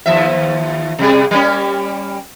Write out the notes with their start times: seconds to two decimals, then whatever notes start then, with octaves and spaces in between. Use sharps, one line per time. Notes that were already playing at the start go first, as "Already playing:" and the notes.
0.06 D#2 F3 E5
0.99 C3 G3 G#4
1.31 G3 A#3 C#4